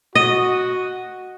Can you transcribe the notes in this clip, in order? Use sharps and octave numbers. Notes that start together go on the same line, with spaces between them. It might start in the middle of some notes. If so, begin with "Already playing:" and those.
F#4 D#5